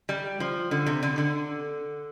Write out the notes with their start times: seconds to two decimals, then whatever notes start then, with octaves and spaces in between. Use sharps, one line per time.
0.09 G3
0.40 F3
0.71 D3
0.86 C3
1.03 D3
1.18 D3